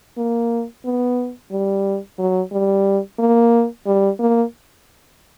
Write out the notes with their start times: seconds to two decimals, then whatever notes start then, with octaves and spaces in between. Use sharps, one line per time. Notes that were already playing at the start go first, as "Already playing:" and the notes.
0.17 A#3
0.85 B3
1.51 G3
2.19 F#3
2.52 G3
3.19 A#3
3.86 G3
4.19 A#3